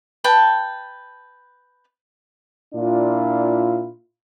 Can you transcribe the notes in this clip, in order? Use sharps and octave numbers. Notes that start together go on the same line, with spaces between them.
B4 G5 A5
A#2 D4 E4 F4